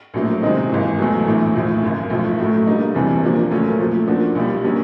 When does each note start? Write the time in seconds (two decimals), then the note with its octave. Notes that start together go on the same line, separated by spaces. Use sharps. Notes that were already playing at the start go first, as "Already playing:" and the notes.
0.14 A#1 A2 F#3 A#3
0.41 C3 D#3 G#3 C4 D#4
0.69 G#1 G#2 E3
0.98 E2 B2 F#3 A3
1.26 A#1 A2 E3
1.54 B1 A2 F3
1.82 G#1 F#2 C#3
2.10 B1 A2 F3
2.38 A2 F#3 A3
2.67 D3 G3 A#3 D#4
2.95 E1 E2 C3 E3 G3
3.23 A#2 F3 A#3 D4
3.51 D#2 C#3 F#3 A3 C#4
3.79 A#2 F3 A3
4.07 A#2 F3 A#3 D4 F#4
4.35 B1 A#2 G3
4.64 D3 F#3 A#3 C#4